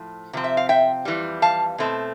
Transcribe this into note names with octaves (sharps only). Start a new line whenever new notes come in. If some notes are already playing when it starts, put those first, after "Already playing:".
Already playing: A2 F3
C3 F3 C4
E5
F5
E5 G5
F2 E3 G3
F5 A5
B2 A3 C4